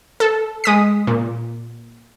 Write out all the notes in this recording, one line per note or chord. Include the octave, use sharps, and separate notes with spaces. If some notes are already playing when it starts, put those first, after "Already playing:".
A4
G#3 D#6 B6
A#2